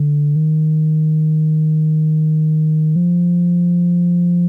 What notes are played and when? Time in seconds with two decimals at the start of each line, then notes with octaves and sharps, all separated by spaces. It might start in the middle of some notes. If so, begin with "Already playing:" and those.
Already playing: D3
0.36 D#3
2.96 F3